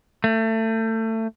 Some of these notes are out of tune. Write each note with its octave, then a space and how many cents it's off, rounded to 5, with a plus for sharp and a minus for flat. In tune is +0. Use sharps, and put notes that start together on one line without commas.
A3 +25